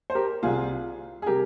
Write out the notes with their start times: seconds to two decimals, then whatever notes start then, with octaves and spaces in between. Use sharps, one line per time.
0.10 C5
0.15 G4 A#4
0.43 C2 C3 G3 C4 F4 G#4
1.22 G#4
1.26 C3 G3 G4 A#4